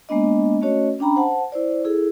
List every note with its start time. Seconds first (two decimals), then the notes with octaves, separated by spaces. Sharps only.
0.09 G#3 A#3 B3 D4 D#5
0.62 A3 C#4 F#4 C#5 D#5
0.99 C#4 D4 G5 A#5 B5
1.16 C5 F#5 A5
1.52 E4 C5 D5
1.84 E4 G#4 A4